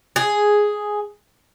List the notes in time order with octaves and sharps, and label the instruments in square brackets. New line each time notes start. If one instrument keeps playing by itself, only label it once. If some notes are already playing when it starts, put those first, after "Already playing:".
[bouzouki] G#4